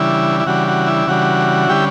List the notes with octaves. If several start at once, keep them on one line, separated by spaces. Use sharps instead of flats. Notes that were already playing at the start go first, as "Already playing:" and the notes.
Already playing: C#3 E3 G3 D4 E4
E4
C#3 E3 G3 D4 F#4
F#4
E4
C#3 E3 G3 D4 F#4
D3 G3 C#4 E4 G4